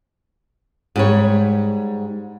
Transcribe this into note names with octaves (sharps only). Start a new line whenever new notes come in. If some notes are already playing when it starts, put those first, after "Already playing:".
G#2 G3 C#5